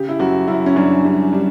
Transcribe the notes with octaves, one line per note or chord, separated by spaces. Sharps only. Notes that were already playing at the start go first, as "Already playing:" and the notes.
Already playing: C#3 G4
E4
F#2 F#4
F#2 E4
C#4
F#2 D4
G3 C#4
G3 D4